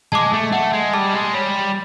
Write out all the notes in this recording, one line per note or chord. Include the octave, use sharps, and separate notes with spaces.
G#3 A5 D6
A3
A3 F#5
G#3
G3 A5 D6
G#3
G3 C#5